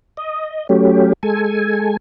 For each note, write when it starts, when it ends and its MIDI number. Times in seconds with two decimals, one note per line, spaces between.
0.17 0.67 75
0.69 1.13 54
0.69 1.13 57
0.69 1.13 61
0.69 1.13 67
1.23 1.97 56
1.23 1.97 69
1.23 1.97 80